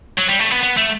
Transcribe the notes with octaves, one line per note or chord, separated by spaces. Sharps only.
F#3
G3
A3
B3
B3
A3